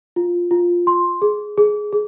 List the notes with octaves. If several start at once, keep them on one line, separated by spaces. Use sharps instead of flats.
F4
F4
C6
G#4
G#4
G#4